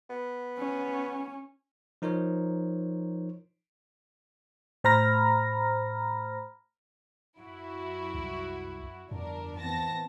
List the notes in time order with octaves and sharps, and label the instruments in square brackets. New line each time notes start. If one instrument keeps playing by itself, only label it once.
[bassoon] B3
[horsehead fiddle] C#4
[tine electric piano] F3 D#4 A#4 C5 C#5
[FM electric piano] A2 C5 A#5 B5 F6 A#6
[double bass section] F#2 [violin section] E4 F#4
[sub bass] C2
[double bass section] G1 [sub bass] F2 [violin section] D4 A#4
[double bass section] E3 B3 C4 [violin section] A5 A#6